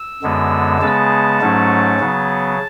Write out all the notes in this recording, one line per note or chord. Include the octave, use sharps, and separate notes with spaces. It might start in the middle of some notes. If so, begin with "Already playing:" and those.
Already playing: E6
F#2 D3 G#3 B3
C#3 G#3 B3 A5
G#2 F#3 A3 C#4
C#3 F#3 B3